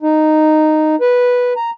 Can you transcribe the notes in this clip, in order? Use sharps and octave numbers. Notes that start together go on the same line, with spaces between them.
D#4
B4
A#5